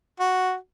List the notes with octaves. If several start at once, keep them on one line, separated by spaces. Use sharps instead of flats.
F#4